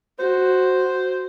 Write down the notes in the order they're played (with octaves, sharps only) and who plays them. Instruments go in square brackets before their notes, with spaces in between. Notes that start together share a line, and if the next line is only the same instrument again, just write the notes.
[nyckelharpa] F#4 [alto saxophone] C5